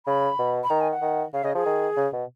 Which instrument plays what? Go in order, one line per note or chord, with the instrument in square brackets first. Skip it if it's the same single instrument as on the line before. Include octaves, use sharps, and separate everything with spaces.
[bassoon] C#3 [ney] B5
[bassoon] B2
[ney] B5
[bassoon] D#3 [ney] A#5
[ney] G#5
F#5
[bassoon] D#3
[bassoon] C#3 [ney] F5
[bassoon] C#3 [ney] D#5
[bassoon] F3 [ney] G#4
[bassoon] D#3
C#3
B2